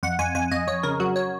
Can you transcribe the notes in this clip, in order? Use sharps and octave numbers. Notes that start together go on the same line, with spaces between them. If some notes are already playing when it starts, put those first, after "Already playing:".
F2 F#5
F2 G#5
F2 G#5
F2 D#5
F2 C#5
C#3 A#4
F#3 F#4
C#5